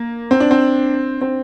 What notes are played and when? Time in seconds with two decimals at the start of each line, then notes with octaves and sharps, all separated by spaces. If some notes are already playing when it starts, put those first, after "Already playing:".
Already playing: A#3
0.31 C4
0.40 D4
0.51 C4
1.21 C4